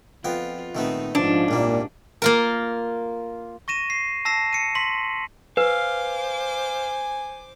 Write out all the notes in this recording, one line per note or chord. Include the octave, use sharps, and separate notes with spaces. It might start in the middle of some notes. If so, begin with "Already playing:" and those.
F2 B3 F4 G5
A#2 D#3 A3 B3 C4 D#4
G#2 F3 C#4 D4
C2 A#2 G3 A#3
A#3 F4 A#4
C#6 A#6 D#7 E7
C7
A5 E6 A#6 C7 E7
C#7 D#7
C6 B6 F#7
B4 C5 F5 G#5 D6